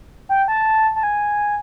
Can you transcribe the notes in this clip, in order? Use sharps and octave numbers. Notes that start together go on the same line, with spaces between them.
G5
A5
A5
G#5